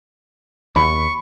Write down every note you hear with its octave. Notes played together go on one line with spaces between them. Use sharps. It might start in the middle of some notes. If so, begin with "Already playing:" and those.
D#2 B5 C#6